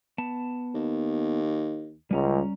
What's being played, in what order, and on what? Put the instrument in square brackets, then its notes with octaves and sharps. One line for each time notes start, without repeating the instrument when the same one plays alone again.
[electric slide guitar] B3 A5
[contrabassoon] D#2
[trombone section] C#2 [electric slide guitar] G3 C#4 A#5